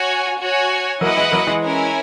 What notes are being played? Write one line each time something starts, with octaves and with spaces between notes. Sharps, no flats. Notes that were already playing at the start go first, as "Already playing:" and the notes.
Already playing: F#4 C#5 G#5
F#4 C#5 G#5
F#3 A#3 E4 B4 D#5 F#5
E3 G#3
F#3 A#3
E3 G#3
C#4 E4 A#4 E5 G#5